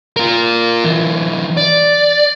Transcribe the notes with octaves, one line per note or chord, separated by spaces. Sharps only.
F4 A#4
D3 E3
D5